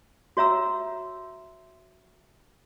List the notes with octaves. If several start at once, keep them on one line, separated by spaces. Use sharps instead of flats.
F#4 C#5 E5 A#5 E6